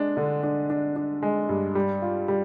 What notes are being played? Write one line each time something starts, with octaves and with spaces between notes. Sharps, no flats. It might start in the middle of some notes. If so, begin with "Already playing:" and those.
Already playing: G#3 D4
D3
D4
D4
D4
G#3
G2
G3
F4
G3